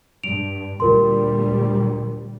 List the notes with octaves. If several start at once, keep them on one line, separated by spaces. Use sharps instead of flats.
G2 D7 F7
D2 A#2 G3 F4 A#4 C6